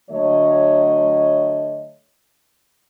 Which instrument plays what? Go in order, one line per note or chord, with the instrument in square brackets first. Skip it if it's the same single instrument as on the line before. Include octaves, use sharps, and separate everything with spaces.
[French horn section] D3 F#3 A3 C#5 D#5